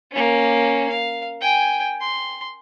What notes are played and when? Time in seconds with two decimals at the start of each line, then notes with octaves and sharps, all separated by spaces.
0.12 A#3 C#4
0.89 F5
1.41 G5 G#5
2.01 C6